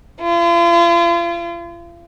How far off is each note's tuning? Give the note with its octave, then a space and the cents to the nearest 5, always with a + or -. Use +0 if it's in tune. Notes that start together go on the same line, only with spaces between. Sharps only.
F4 -40